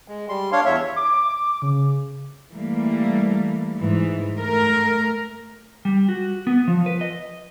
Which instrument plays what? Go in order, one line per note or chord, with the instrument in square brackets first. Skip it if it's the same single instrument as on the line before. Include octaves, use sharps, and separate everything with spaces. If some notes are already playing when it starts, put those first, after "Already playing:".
[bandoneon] G#3
G3 C6
D4 C#5 F5 C6
E2 C#5 E5
[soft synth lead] D6
C#3
[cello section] E3 G3 A3 A#3
G#2 E3
A3 A#4
[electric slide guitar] G3
F#4
B3
F3
B4
D#5